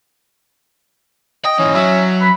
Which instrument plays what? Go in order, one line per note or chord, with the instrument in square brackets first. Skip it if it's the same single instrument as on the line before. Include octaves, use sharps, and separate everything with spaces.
[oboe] D#5 [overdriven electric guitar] G5
[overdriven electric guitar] G#2 E3 [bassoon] C#4
[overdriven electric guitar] F#3 [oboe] E5
[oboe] B5